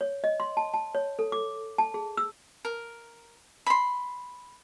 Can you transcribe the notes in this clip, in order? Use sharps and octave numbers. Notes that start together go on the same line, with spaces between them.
C#5
D#5
C6
A5
A5
C#5
A4
D6
A5
G#4
E6
A#4
B5 C6